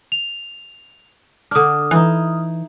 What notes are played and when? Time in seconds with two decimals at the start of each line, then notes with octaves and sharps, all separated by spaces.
0.12 F7
1.51 D3 D4 D#6 F6
1.91 E3 D#4 E4